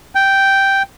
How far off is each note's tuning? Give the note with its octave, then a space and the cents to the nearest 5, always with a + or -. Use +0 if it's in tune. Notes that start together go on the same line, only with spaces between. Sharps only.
G5 -5